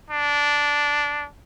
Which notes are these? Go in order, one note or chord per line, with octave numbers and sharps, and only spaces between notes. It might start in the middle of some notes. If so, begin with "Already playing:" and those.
D4